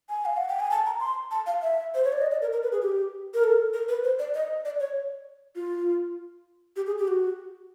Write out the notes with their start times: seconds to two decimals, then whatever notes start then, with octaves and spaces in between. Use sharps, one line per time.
0.09 G#5
0.25 F5
0.37 F#5
0.48 G5
0.60 G#5
0.71 A5
0.86 A#5
1.00 C6
1.31 A5
1.46 F5
1.62 E5
1.95 C5
2.04 C#5
2.12 D5
2.21 D#5
2.31 D5
2.42 A#4
2.52 A#4
2.63 B4
2.72 G#4
2.82 G4
3.34 A#4
3.44 A4
3.73 A#4
3.88 B4
4.04 C5
4.19 D5
4.35 D#5
4.65 D5
4.80 C#5
5.56 F4
6.76 G4
6.86 G#4
6.98 G4
7.08 F#4